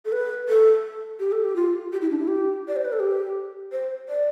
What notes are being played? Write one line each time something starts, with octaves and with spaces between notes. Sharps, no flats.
A4
B4
A4
G4
A4
G4
F4
G4
E4
D4
E4
G4
D5
C5
B4
A4
G4
C5
D5